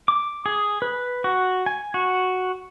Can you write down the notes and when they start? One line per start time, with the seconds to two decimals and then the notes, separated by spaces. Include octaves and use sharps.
0.08 D6
0.46 G#4
0.82 B4
1.24 F#4
1.66 G#5
1.94 F#4